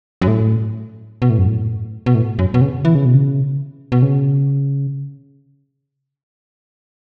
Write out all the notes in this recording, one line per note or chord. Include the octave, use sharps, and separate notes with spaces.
F#2
A2
B2
A2
F#2
A2
B2
A2
F#2
B2
C#3
E3
C#3
B2
C#3
B2
C#3